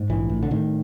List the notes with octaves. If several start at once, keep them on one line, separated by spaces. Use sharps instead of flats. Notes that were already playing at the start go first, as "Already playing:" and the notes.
Already playing: G#2
A#1 E3
A2
D3
A2 D#3